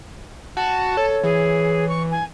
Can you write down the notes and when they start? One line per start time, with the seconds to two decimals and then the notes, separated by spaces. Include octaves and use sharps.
0.57 F#4 A5
0.97 A4 C#5
1.24 E3 G#4
1.89 C#6
2.11 G#5